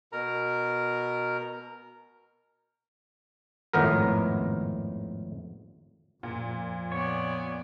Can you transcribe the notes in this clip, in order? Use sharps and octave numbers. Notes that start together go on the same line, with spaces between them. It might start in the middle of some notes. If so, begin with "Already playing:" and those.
B2 A#4 A#5
G#1 F2 A2 B3 A#4
F2 A#2
B3 C#5 D5